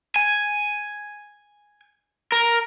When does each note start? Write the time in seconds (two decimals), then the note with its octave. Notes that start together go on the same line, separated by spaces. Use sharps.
0.16 G#5
2.32 A#4